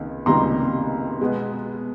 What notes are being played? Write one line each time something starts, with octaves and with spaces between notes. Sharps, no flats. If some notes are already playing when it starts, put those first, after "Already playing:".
Already playing: C#2 C3 D#3 A#3
C#2 C3 D#3 G3 A#3 A#5 C6
B2 G#3 B3